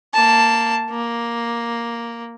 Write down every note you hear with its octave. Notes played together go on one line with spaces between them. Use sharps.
A#3 A5
A#3